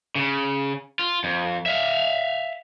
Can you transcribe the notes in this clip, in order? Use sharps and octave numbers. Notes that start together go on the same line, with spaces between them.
C#3
F4
F2
E5 F5